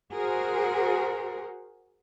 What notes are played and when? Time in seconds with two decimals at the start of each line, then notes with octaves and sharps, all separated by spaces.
0.13 F#4 G#4 A#4 C5